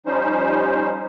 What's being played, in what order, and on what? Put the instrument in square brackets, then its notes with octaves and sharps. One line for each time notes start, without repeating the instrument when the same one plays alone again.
[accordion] F3 G3 C#4 D#4 C5